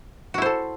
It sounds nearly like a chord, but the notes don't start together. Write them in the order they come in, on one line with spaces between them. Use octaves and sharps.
F#4 E4 C5 A4